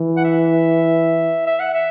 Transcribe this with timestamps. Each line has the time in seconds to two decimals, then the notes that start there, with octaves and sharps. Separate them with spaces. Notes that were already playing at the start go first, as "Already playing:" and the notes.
Already playing: E3
0.17 F#5
0.24 E5
1.47 E5
1.60 F#5
1.74 E5